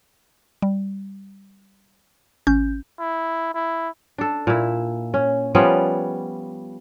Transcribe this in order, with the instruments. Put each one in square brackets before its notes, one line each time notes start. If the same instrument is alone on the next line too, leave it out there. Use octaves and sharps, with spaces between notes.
[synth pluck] G3
G#1 C#4 G6
[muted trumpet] E4
E4
[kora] D4 A4
A#2 E4
C#4
F3 G3 B3 C#4